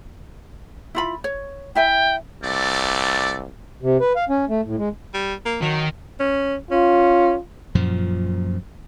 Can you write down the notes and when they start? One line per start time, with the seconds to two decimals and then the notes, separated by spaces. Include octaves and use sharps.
0.95 E4 F4 B5
1.24 C#5
1.75 E4 E5 G5 G#5
2.42 C2 A3 A4 D5
3.82 C3
4.00 B4
4.16 F5
4.29 C#4
4.49 A3
4.65 A2
4.78 G#3
5.14 G3
5.46 A#3
5.62 D#3 F#3
6.20 C#4
6.71 C#4 F4
7.75 F#2 A#2 F3